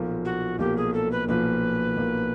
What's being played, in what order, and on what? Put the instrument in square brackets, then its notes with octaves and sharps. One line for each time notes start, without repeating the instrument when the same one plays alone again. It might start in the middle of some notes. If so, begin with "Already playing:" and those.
Already playing: [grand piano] B1 A#2 F3 A#3
[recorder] F#4
[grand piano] B1 A#2 F3 A#3 [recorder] G4
[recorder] G#4
A4
B4
[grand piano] B1 A#2 F3 A#3 [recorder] B4
[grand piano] B1 A#2 F3 A#3